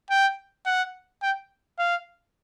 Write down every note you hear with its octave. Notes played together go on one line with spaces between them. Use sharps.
G5
F#5
G5
F5